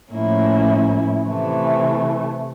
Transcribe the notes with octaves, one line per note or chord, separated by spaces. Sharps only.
A2 F3 A#3 C#4 E4
C3 E3 A3